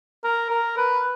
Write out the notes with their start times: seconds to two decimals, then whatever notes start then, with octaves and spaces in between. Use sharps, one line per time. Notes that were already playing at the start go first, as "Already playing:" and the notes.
0.24 A#4
0.51 A#4
0.77 B4